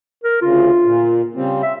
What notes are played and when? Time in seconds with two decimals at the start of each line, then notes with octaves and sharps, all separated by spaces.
0.24 A#4
0.42 D2 C#3 F4
0.85 A#2
1.35 C#3 G3 C4
1.63 E5